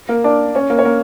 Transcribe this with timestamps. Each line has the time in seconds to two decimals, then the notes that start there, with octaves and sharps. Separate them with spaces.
0.09 A#3 A#4
0.24 D4 D5
0.55 C#4 C#5
0.70 A#3 A#4
0.79 C#5
0.85 A#3 A#4